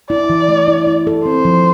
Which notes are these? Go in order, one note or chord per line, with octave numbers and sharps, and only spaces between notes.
E4 D5
E3
A3
E4
E4
A4
C4 C5
F3